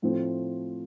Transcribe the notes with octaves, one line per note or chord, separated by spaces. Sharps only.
A2 F3 A3 C4